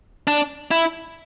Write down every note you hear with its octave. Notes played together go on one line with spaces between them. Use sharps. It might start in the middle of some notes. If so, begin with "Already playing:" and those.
D4
E4